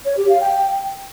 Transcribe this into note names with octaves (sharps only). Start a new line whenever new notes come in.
C#5
G4
F5
G5